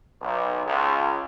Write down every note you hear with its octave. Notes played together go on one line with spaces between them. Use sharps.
B1
C#2